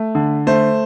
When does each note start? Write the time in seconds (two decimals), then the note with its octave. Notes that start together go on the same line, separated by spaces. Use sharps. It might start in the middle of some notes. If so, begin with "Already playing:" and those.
Already playing: A3
0.15 D3
0.47 A3 C5